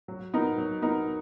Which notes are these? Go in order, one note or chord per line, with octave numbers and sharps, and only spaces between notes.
F#3
B3 D#4 A#4
F#3
B3 D#4 A#4